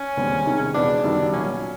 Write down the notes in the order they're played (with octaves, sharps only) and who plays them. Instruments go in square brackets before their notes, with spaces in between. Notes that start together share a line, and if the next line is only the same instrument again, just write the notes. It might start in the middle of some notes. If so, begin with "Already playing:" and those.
Already playing: [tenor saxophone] C#4
[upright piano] E1 D#2 D3 G3 C4
C3 D#3 G#3
[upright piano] E1 E2 B2 G#3 B3 [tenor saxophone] D4
[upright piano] F#2 D#3 G3
[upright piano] B1 A#2 F#3 [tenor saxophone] C#4